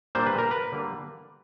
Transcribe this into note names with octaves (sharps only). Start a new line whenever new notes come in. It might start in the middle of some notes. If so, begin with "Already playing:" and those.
A#2 G3 A#3 D4 C5
B4
A#4
B4
D3 G3 A#3